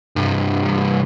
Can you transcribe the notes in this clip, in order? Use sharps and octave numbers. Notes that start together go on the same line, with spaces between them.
C2 G2